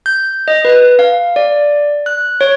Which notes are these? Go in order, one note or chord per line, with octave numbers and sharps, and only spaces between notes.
G6
D#5
B4
F5
D5
F#6
C#5